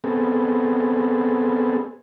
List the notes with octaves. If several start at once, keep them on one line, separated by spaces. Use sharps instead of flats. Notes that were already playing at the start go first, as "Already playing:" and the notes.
B3 C4 G#4 A4